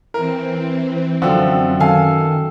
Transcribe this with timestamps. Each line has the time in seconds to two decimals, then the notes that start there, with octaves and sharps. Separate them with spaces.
0.14 E3 C4 A#4
1.22 F#2 D3 F3 C4 F#4 E5 G5
1.80 D#3 A4 F5 G#5